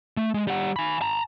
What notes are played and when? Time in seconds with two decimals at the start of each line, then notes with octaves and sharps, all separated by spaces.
0.17 A3
0.34 G#3
0.47 G3 F#5
0.76 G#5 B5
1.01 A5 A#5